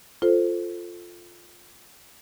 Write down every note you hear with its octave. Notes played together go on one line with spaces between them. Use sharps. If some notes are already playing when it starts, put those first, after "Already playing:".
F4 A4 C5